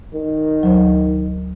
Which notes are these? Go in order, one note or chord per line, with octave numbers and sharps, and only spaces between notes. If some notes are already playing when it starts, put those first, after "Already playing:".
D#3
D2 F#3 C5